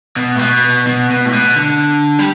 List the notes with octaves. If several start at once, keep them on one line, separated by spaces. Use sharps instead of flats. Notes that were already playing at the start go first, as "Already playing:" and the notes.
B2
A2
B2
B2
B2
A2
B2
D3
G3